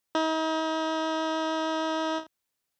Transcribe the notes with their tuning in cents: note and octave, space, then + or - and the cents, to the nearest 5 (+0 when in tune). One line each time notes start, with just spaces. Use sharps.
D#4 +40